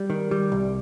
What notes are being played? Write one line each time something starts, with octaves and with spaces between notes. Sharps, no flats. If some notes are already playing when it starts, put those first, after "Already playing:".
Already playing: G3
D#3
G3
C2